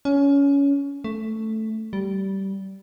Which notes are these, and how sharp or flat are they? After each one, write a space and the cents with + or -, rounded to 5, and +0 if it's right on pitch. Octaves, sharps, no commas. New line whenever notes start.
C#4 +20
A3 +0
G3 -20